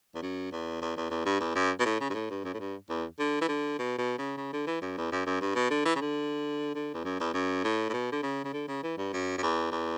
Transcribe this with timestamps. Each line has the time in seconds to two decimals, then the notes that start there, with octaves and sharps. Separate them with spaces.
0.15 E2
0.22 F#2
0.52 E2
0.82 E2
0.97 E2
1.10 E2
1.25 G2
1.40 E2
1.55 F#2
1.79 B2
1.85 A2
2.00 C#3
2.10 G2
2.14 A2
2.30 G2
2.45 F#2
2.54 A2
2.60 G2
2.89 E2
3.19 D3
3.41 E3
3.48 D3
3.79 B2
3.98 B2
4.18 C#3
4.37 C#3
4.53 D3
4.67 E3
4.81 F#2
4.97 E2
5.12 F#2
5.26 F#2
5.41 G2
5.56 B2
5.70 D3
5.85 E3
5.96 C#3
6.01 D3
6.75 D3
6.94 E2
7.05 F#2
7.20 E2
7.34 F#2
7.64 A2
7.89 A2
7.93 B2
8.12 D3
8.23 C#3
8.45 C#3
8.53 D3
8.68 C#3
8.83 E3
8.98 G2
9.13 F#2
9.38 F#2
9.43 E2
9.72 E2